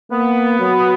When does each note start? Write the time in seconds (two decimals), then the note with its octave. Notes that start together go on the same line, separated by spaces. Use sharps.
0.11 A#3 B3
0.59 F#3